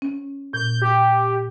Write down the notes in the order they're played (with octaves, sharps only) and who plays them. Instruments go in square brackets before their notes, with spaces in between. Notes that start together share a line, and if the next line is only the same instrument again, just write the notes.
[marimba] C#4
[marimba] A#2 [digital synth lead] G6
[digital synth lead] G4